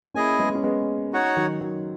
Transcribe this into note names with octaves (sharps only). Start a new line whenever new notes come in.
A#3 C#4 E4 G#4 D#5 G#5
G#3 B3
C#4
G#3 B3
D#4 F#4 C#5 F#5
D#3 F#3
D#3 F#3